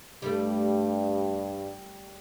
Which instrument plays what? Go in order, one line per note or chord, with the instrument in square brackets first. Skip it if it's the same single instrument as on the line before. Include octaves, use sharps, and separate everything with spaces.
[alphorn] G2 [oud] G3 A3